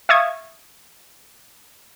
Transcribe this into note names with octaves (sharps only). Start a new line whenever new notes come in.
E5 F5 C#6 D#6 G#6